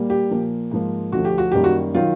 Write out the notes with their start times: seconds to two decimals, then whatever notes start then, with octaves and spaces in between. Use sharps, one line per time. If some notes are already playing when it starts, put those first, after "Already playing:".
Already playing: A#2 G3 A#3
0.10 G4
0.31 A#2 F3 A#3
0.71 G#2 F3 A#3
1.12 D2 D3 F3 F#4
1.25 G4
1.38 F#4
1.52 F#2 D#3 G3 A#3 G4
1.64 F#4
1.95 D#3 F#3 F4